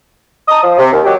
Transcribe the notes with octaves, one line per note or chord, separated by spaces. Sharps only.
D#5 A5 A#5 D#6
F3
C3
D#2
D#3 F#3 F#4 G4